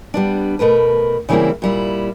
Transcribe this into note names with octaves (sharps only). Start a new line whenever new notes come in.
G3 B3 D4
B2 A3 A#4 B4
C#3 E3 G3 A#3 C4 E4
A#2 G3 E4